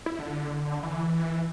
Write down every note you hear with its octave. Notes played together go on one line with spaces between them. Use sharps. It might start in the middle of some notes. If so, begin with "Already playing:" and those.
E4
D3
E3